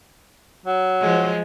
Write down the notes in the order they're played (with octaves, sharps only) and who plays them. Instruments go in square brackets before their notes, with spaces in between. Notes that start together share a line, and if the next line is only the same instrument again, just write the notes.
[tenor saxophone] F#3
[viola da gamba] F3 G#3